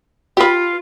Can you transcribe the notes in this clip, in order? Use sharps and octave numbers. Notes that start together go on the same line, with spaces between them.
F4 G4 B4